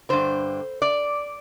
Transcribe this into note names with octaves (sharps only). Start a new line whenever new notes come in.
G2 D3 C5
D5